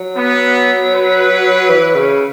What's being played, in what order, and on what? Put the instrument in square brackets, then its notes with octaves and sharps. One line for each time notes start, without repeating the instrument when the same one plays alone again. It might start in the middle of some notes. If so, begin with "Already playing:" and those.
Already playing: [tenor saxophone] F#3
[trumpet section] B3
B4
[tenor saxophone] E3
C#3